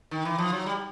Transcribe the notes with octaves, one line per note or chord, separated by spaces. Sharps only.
D#3
E3
F3
F#3
G3